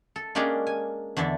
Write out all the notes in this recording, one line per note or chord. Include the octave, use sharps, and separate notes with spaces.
A4
G#3 A#3 C#4 D4 G4 G#4
G#5
E2 D3 D4 E5